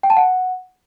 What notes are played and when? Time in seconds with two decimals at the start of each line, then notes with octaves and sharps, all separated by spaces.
0.03 G5
0.10 A5
0.17 F#5